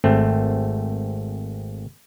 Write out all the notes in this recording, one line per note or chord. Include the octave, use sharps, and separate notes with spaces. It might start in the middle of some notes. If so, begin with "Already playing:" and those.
G#1 A3 C4